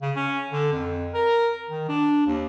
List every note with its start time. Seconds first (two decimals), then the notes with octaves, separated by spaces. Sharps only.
0.02 C#3
0.16 C#4
0.51 D3
0.72 F2
1.14 A#4
1.69 D#3
1.89 D4
2.26 D#2